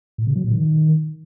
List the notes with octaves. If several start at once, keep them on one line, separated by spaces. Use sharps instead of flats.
A2
C#3
F#3
A#2
D#3